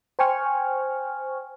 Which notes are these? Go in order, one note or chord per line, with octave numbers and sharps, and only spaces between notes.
C5 G5 G#5 C#6 F6